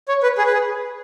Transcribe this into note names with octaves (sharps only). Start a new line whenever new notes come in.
C#5
B4
G#4
B4
G#4